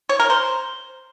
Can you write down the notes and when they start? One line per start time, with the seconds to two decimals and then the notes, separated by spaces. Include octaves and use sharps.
0.09 C#5
0.20 A#4
0.30 C5